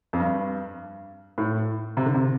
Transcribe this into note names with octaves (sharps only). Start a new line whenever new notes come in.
F2
G2
A2
C3
D3
C3